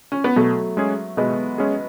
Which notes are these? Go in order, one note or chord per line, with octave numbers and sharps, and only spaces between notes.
C#4
B3
B2 F#3 A3
G#3 C#4 G#4
B2 G#3 B3
G#3 C#4 G#4